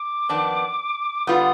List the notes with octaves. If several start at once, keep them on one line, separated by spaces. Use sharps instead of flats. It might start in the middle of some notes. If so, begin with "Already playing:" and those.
Already playing: D6
F2 D#3 B3 D4
D3 G3 B3 F4 D#6